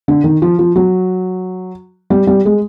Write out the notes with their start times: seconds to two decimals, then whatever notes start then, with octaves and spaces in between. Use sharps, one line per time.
0.08 D3
0.24 D#3
0.42 F3
0.59 F3
0.76 F#3
2.10 G3
2.27 G3
2.45 G#3